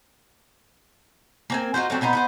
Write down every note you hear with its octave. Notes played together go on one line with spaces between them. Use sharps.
A#3 C4 G#5
D#4 F4 F#4 C5
F#3 A3 C4 D4
B2 B3 D#4 C5
B3 D#4 C5